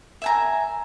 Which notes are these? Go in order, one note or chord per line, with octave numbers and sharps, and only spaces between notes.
E5 G#5 A#5